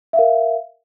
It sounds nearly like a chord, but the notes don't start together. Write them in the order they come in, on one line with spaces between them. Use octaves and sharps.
E5 F5 A#4